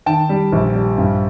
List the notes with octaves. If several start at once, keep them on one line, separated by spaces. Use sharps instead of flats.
D#3 G5 A5
G3
A#1
G3
G2